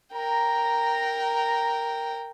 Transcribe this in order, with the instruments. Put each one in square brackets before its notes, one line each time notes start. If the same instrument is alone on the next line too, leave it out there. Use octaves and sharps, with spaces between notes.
[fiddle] A#4 G5 [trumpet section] A#5